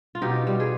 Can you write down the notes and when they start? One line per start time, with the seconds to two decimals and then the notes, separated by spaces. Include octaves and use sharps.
0.15 F4
0.22 B2 D#4 G4
0.47 G3
0.60 G#4